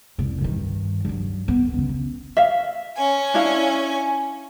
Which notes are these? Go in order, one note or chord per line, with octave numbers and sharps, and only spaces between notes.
F1 C2
G2 D#3
G2 F#3
B3
C#2 D3
E5 F5
C#4 G#5
D4 E4 F5